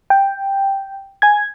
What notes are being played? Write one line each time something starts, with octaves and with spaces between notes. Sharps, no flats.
G5
G#5 G#6